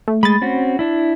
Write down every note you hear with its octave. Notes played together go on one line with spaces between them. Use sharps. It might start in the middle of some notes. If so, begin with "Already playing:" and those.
A3
G#3 B5 A6
C4 C#4 F#4
D4 E4